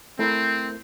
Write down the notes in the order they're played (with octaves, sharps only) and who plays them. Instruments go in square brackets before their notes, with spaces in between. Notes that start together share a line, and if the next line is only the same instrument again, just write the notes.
[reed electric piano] A3 E4 A#4 [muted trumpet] C4